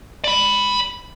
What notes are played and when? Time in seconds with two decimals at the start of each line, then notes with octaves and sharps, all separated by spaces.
0.24 D5 B5